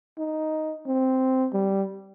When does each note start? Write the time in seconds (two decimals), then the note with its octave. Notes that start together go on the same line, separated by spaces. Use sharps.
0.18 D#4
0.86 C4
1.53 G3